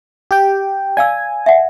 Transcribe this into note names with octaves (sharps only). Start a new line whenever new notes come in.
G4 G5
D5 F5 G#5 E6
E5 F#5